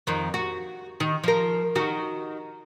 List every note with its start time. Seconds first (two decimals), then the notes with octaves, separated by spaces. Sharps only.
0.07 F2 D#3
0.34 F#4
1.00 D#3
1.24 F3 A#4
1.75 D#3 F#4